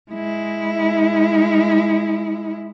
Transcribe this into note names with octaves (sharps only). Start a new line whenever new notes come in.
G#3 E4